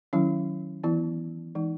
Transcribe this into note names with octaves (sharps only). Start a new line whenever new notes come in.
D#3 F#3 C#4 E4
E3 B3 E4
E3 G#3 D#4